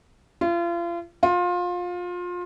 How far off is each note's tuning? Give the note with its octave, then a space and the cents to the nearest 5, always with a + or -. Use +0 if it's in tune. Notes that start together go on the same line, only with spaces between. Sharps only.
F4 -35
F4 +25